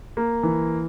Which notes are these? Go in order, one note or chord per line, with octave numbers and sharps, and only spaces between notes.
A#3
E3